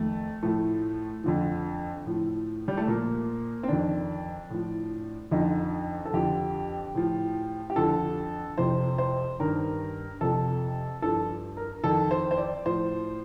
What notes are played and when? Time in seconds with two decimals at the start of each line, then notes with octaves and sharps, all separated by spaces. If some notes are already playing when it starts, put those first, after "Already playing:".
Already playing: F2 D#3 A3
0.43 A2 F3 A3
1.24 F2 D3 F3
2.06 A2 F3
2.68 G3
2.77 A3
2.87 A#2 F3 A#3
3.63 C4
3.68 F2 D#3 D4
4.50 A2 F3
5.31 F2 D3 F3 D#4
6.05 A4
6.13 F2 D3 F3 G4
6.95 A2 F3
7.70 G4
7.76 F2 D3 F3 A4
8.58 F2 C3 F3 C5
8.98 C5
9.40 G2 D#3 A#4
10.21 F2 C3 F3 A4
11.02 G2 F3 A4
11.57 A#4
11.84 F2 D#3 A4
12.11 C5
12.31 C5
12.38 D5
12.65 A2 F3 C5